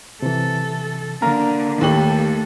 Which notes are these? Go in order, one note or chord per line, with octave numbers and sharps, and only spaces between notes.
C3 E3 A4
D3 A#3 A#4 F5 A#5
D#2 A3 G4 A4 F#7